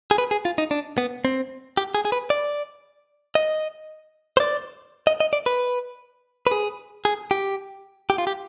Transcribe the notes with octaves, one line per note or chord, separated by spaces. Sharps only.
G#4
B4
G#4
F4
D#4
D4
B3
C4
G4
G#4
G#4
B4
D5
D#5
C5
D5
D#5
D#5
D5
B4
B4
G#4
G#4
G4
G4
F4
G4